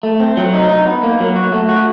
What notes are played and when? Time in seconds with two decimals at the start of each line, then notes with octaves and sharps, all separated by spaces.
0.03 A3
0.20 C4
0.37 F#3
0.54 D#4
0.69 D#4
0.86 B3
1.03 A#3
1.20 F#3
1.36 F#4
1.52 A3
1.69 F#4